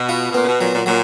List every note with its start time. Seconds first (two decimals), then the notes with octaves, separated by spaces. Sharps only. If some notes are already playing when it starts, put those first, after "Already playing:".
Already playing: B2
0.09 F4
0.31 B2
0.34 A#2 B3
0.42 C#3
0.48 B2
0.61 A#2 F#3
0.73 A#2
0.86 A#2 F#3